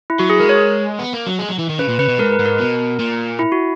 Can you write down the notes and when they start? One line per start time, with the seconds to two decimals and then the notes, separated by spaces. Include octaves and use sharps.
0.10 E4
0.19 F#3 F#4
0.30 G#4
0.39 G#3 A#4
0.49 C#5
0.99 B3
1.13 A#3
1.27 F#3
1.39 G#3
1.49 F#3
1.59 E3
1.70 D#3
1.79 C#3 B4
1.89 A#2
1.99 C#3 B4
2.09 B2
2.19 G#2 A#4
2.32 B4
2.40 G#2
2.46 A#4
2.59 B2
2.99 A#2
3.39 E4
3.52 F#4